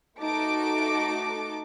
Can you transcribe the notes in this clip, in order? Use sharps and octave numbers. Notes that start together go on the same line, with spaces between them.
A3 D#4 F#4 A5 D6 D7